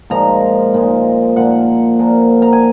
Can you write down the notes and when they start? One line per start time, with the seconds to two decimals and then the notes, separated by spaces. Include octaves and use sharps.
0.10 A#2 F3 G#3 A#5
0.74 A#2 F3 G#3
1.36 A#2 F3 A#3 F#5
1.99 A#2 F3 A#3
2.42 A#5
2.53 G#5